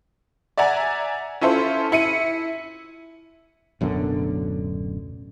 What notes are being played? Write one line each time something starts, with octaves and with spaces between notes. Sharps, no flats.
D5 E5 F#5 G#5 A#5
C#4 E4 F4 A4 C5
E4 C#7 D#7
D1 F#2 B2 D3